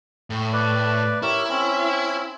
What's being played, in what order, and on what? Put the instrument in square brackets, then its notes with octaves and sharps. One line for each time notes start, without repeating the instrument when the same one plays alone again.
[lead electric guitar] A2
[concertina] B4 D5
[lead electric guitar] E4 [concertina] G4 A#4 C#5
[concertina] C4 C#4